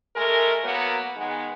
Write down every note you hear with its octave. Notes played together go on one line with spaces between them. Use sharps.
G#3 A3 A#4
F#3 A#3 B3
D#3 G#3 B3